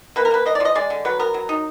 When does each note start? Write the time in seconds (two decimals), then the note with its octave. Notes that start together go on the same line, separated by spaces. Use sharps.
0.16 A#3 B4
0.25 A#4
0.31 A#3 B4
0.46 A#3 D#5
0.55 D5
0.60 F3
0.65 D#5
0.75 G#3 D5
0.90 D3
1.05 F#3 B4
1.19 B3 A#4
1.34 F#3
1.49 D#4